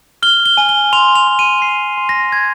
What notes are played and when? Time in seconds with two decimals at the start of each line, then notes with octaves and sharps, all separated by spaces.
0.23 F6 G7
0.46 G7
0.57 G#5
0.69 G7
0.93 C6 F7
1.15 F7
1.27 C6
1.39 D#7
1.62 C6 C7
1.98 C6
2.09 A#6
2.32 G6 G#6